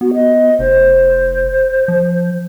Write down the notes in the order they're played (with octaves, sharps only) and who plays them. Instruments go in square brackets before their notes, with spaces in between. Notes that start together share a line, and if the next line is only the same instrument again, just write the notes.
[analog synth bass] B3 [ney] F#4
[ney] D#5
[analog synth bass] F1 [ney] C5
[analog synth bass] F3